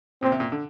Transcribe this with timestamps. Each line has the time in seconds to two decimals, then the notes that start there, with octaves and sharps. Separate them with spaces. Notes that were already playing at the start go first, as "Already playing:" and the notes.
0.22 A#2 C4
0.32 C3
0.40 A#2
0.52 D3